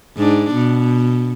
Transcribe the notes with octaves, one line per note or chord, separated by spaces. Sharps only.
G#2 D4
B2